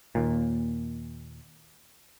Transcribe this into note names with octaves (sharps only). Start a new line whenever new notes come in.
D#2 A#2